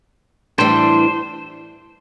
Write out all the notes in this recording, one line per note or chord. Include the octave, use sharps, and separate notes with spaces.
A2 E3 G3 D4 C5